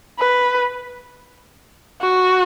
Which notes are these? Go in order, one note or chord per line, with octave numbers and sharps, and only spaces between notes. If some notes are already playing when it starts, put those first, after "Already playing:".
B4
F#4